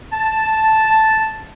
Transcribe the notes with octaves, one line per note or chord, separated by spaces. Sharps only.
A5